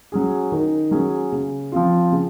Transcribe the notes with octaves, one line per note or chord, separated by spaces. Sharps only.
F#3 C#4 G#4
D#3
F#3 C#4 G#4
C#3
F3 C4 F4
C#3